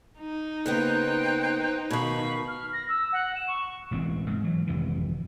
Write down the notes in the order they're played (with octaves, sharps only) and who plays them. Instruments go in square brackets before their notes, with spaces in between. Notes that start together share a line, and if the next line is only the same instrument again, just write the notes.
[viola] D#4
[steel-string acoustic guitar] C#3 A#3 B3 [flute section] C5 G5 F#6
[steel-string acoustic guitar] B2 D#3 [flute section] F5 B5 C#6
[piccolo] F6
A#6
E6
F#5
E7
C#6
[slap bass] E1 A1 E3 C4
G#2
E3 F#3
G#1 F2 C3 E3